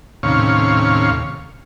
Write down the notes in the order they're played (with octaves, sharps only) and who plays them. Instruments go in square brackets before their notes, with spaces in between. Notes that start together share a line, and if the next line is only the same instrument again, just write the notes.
[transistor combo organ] D#2 A2 C3 C#4 C#5 F5